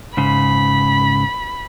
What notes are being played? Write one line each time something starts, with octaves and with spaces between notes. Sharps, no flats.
G#2 C#3 B5